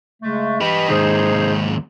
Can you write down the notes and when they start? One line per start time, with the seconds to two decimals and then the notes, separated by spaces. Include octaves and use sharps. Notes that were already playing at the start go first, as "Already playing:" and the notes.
0.22 C#3 G#3 A3
0.61 E3 G4 B4 D#5 B5
0.89 D#2 G#2 D#4 G#4 C5